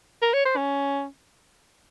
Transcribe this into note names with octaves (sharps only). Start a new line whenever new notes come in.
A#4
C#5
C5
C#4